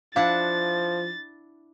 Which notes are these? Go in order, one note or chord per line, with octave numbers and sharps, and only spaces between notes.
F3 D4 E4 F5 F#5 A6